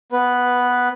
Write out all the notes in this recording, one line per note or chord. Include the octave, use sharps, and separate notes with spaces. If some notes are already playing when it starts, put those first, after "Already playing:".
B3 B4